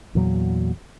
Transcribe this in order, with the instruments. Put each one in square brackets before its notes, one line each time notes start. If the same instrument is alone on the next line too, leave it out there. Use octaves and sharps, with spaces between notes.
[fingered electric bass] E2 A#2 F#3